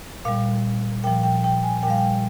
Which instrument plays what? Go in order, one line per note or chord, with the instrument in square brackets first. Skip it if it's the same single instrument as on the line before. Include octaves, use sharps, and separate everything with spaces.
[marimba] A#2 G3 F5
A#2 F3 G5
G5
G5
G#5
A#2 G5
G3 F5
G5